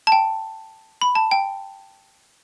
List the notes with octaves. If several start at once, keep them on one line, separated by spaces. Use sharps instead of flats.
A5
G5
B5
A5
G5